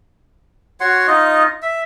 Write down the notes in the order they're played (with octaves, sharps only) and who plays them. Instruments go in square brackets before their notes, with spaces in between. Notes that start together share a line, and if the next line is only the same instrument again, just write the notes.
[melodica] F#4 C#5 F#5 C6
D#4 F4 D#5
E5